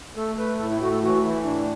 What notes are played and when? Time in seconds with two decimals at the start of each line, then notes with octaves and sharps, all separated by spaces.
0.16 A3 A4
0.37 A3 B4
0.59 A2 A4
0.71 E4
0.80 A3 F#4
0.92 A4
1.02 E3 F#4
1.23 E3 E4
1.44 A2 D4